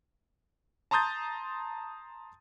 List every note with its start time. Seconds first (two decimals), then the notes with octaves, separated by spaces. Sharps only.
0.91 A5 A#5 C6 D#6 G6 A6